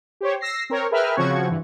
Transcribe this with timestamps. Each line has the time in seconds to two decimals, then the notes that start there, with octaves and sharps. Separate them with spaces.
0.21 G4 C5 C#5
0.41 E6 A#6 C7
0.70 C4 A#4 C#5
0.91 G#4 A#4 B4 E5 G5 F6
1.16 C#3 F3 C4 F#4 C#6 G#6
1.48 G2 E3